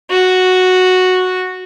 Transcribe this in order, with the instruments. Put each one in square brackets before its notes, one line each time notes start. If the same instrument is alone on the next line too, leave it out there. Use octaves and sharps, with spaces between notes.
[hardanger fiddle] F#4